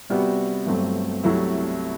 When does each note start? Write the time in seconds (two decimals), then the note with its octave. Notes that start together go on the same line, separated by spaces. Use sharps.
0.10 C3 G3 B3 F#4
0.67 G1 G2 F#3 A3 C4
1.23 C2 C3 F#3 A3 E4